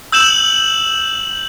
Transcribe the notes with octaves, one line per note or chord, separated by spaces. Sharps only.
E6 G6 E7 F#7